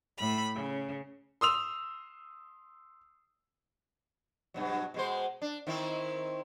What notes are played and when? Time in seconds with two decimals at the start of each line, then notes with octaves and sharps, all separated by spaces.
0.19 A2 B5
0.55 C#3
1.41 C6 D#6 E6 F7
4.54 G2 B2 F#3
4.94 B2 G#3 C5
5.42 D4
5.67 D#3 C4 E4